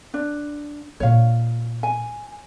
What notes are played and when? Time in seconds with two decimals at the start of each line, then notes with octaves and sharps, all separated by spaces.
0.14 D4
1.00 A#2 D4 C#5 F5
1.83 G#5